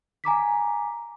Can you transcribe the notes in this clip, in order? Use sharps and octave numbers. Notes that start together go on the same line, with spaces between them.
G#5 A#5 D6 B6